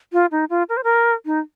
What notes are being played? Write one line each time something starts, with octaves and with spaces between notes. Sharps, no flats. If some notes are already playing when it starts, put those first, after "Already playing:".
F4
D#4
F4
A#4
C5
A#4
D#4